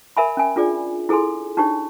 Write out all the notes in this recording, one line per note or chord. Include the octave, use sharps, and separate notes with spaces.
A#4 E5 G#5 B5
C#4 G#5
D4 F4 G#4 D5
E4 G#4 A4 G#5 C6
D4 D#4 G4 C#5